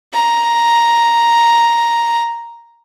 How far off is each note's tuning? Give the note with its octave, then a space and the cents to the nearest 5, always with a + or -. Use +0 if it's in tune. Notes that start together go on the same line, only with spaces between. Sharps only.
A#5 +5